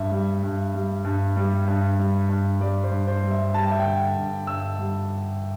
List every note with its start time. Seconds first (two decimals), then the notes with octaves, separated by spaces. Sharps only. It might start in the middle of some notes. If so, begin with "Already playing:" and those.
Already playing: G2 E5
0.12 G3
0.43 G2
0.75 G3
1.05 G2
1.36 G3
1.68 G2
1.99 G3
2.29 G2
2.60 G3 D5
2.84 C5
2.91 G2
3.07 C5
3.23 G3
3.31 E5
3.54 G3 A5
3.63 G5
3.71 E5
3.80 D3 G5
4.16 G2
4.47 G2 E6
4.79 G3